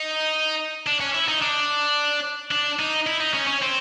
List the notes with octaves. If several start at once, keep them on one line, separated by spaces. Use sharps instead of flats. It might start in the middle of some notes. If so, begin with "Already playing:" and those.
Already playing: D#4
D4
C#4
E4
D#4
D4
D4
D#4
E4
D#4
C#4
C#4
C4